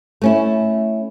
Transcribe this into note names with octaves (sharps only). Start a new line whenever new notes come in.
A3 C#4 E4